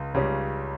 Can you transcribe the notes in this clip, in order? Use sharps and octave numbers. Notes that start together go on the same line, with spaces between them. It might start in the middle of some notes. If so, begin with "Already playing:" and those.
Already playing: C#2 C#3
C#2 C#3 G3 C#4